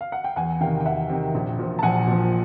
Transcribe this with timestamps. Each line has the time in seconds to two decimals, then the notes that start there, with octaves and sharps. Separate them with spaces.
0.01 F5
0.12 F#5
0.24 G5
0.36 E2 F#5 G#5
0.61 C3 D#3 F5 G5
0.80 G5
0.86 E2 E5 F#5
1.10 C3 D#3
1.34 A#1
1.59 A#2 F3
1.79 A5
1.83 A#1 F#5 G#5
2.07 A#2 F3